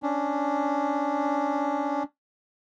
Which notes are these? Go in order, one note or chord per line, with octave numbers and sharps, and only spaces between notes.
C#4 D4